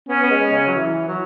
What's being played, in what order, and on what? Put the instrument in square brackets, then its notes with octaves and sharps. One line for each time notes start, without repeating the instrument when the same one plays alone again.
[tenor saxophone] B3 [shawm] C#4
[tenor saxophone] B3
G#3
C#3
F#3
E3
F#3